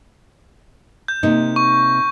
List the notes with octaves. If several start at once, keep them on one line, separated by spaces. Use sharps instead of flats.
G6
C3 A#3 D#4
C#6